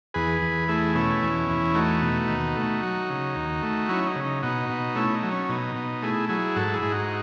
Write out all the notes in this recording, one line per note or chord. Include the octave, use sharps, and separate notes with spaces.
E2 G#4 B4
E2
A3 E4 G#4
B2 C#4 E4
E2
E2
A3 D#4 F#4
B2
D#2
A3
F#3
C#3
D#2
A3
F#3 C#4 E4
D#4
C#3
D#4
B2 D#4 F#4
B2
A3 C#4 E4
D#4
F#3
C#4
B2 D#4
B2
A3 E4 G#4
F#3 E4 G#4
G#2 F#4 A4
E4 G#4
G#2
D#4 F#4